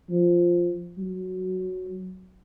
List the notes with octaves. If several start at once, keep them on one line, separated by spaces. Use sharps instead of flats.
F3
F#3